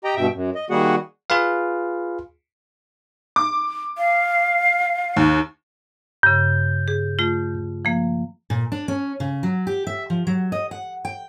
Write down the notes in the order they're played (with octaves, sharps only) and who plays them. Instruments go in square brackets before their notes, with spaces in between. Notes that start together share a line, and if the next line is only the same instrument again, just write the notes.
[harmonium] G4 D#5 G5 A#5
G2 B2 E5 G5
F#2
D#5
D#3 G3 A#3 F#4 G#4 F#5
[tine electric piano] F4 G#4 B4 F5
[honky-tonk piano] D6
[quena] F5
[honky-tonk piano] D#2
[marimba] G2 C#3 [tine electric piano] G6
[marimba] G#4
A3 F4
F3 A#3
[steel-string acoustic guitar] A#2
D4
C#4
C#3
F#3
G4
E5
F3
F#3
D#5
F#5
G5